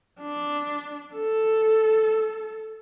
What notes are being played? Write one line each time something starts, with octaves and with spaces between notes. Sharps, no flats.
D4
A4